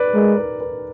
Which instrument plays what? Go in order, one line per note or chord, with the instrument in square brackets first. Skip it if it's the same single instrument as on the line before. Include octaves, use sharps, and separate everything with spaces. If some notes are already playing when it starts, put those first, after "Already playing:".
Already playing: [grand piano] B4 D5
[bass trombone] G#3 [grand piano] A#4
[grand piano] B4
B4